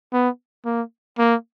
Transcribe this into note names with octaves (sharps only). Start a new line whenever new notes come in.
B3
A#3
A#3